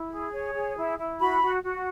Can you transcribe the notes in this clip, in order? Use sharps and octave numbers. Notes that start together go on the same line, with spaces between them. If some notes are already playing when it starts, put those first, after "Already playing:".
Already playing: E4
G#4
C#5
G#4
E4
E4
F#4 B5
F#4
F#4